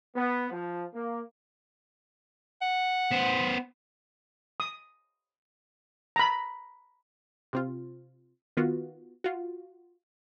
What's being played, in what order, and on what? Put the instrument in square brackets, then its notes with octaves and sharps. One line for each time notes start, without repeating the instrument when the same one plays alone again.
[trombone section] B3
F3
A#3
[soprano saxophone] F#5
[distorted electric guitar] B3 C5
[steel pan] D#6
A#5 B5
[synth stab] C3 C4 F4
D#3 B3 F4 F#4
F4 F#4